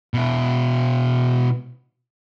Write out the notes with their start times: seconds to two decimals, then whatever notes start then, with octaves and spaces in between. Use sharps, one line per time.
0.14 B2 E4